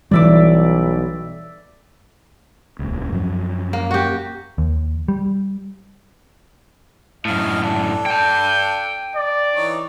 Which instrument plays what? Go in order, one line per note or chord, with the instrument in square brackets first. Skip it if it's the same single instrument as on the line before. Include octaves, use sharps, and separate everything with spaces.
[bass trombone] B1 [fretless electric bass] E3 G3 [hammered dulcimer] D5 E5 D6
[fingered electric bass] D#1 C#2
F#2 F3 F#3
[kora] A#3
F#4 G4
[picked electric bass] D#2
G3
[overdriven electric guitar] F#2 A2 [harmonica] D#5 F5
[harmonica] D4 A4
[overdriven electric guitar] G5 A5 [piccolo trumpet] G6
[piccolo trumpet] D5
[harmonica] E3 D#4 C#5